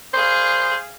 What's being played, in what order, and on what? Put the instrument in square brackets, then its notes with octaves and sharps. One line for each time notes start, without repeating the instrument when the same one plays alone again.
[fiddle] G#4 F5 [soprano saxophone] C5